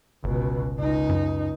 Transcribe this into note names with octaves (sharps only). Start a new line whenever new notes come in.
G1 C#2 B2
C#2 D#4
F#2